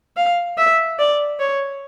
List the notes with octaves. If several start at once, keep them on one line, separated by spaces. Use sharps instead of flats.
F5
E5
D5
C#5